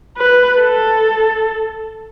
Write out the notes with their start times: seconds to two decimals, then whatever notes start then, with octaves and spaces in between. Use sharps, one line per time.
0.17 B4
0.60 A4